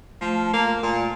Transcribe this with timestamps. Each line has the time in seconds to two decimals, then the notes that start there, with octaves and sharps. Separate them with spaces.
0.21 F3 A3
0.53 A#3
0.83 A#2